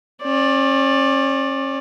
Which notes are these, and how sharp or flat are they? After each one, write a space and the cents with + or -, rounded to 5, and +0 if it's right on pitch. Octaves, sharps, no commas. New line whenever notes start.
C#4 -40 D5 +0